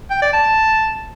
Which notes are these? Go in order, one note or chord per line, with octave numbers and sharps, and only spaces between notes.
G5
D5
A5